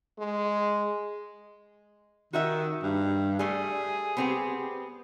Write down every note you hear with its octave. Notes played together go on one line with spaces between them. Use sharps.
G#3
D#3 F#4 D#5 E5
G2
G3 A3 G#4
B3 C4 G4